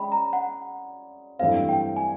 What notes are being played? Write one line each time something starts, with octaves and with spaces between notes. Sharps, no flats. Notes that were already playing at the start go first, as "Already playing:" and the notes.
Already playing: G#3 C#4 D5 G5 B5
A#5
F#5
G2 E3 A3 C4 F5
G5
G#5